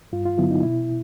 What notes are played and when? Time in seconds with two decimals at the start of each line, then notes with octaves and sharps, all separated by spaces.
0.12 G2 F4
0.26 F4
0.38 D3 F#3 B3 E4
0.51 D#4
0.63 B2 E4